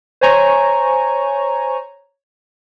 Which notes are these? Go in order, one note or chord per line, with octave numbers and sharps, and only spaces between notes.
C5 C#5 G#5 A#5 C#6